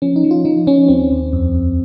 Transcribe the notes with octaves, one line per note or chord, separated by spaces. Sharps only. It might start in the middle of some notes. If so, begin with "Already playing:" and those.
F3 C#4
D#4
F3
F4
F3 D#4
F3 C#4
D#2 C4
D#2
F2
F2